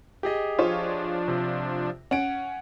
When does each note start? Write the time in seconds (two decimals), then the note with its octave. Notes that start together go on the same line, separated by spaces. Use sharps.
0.23 G4 G#4 D#5
0.59 F3 D4 F4 C5 C#5
1.28 C3
2.11 C#4 F#5 D7